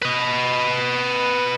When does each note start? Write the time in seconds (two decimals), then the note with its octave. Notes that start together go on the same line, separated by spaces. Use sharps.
0.02 B4 D#5